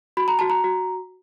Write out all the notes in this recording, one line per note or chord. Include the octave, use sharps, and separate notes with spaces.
F#4 B5
A#5
F#4 A5
A#5
F#4